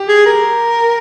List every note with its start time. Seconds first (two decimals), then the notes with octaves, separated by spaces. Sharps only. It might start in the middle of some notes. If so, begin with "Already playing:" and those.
Already playing: G4
0.09 G#4
0.26 A#4